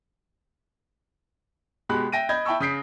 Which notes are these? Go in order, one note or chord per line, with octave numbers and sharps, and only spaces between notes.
B2 G#3 G4 B5 F#6
E5 G5 A#6 D7 D#7
D#5 B5 G6 G#6
E4 G5 A5 B5 C#6 E6
C#3 D#6 G6 B6 C7 D7